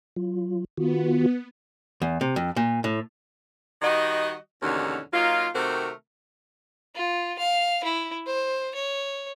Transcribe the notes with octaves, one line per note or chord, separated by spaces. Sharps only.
F#3 F4
D#3 B3 F4 F#4
E2
C3
F2
A#2
A2
D#3 G3 F#4 D#5
D#2 G#2 B2 D3 E3 C#4
F#3 A#3 D#4 F4
C3 D#3 A3 C4 F#4 A#4
F4
F5
E4
C5
C#5